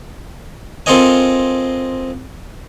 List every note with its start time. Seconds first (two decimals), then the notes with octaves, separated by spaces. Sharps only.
0.86 C4 F4 A4 A#4 D#5 G#5